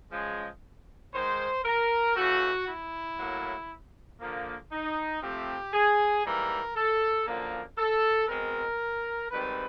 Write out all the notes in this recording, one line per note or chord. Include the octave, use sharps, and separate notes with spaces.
C#3 F3 G#3
G#2 D#3 G#3 C5
A#4
C#3 E3 A3 F#4
E4
A2 F#3 A#3
D3 F3 A#3
D#4
C3 F3 A3 C4 G4
G#4
G#2 E3 G3 A#3 A#4
A4
F#2 D3 F3 A#3
A4
B2 G#3 C4 A#4
G#2 D#3 G3 C4 B4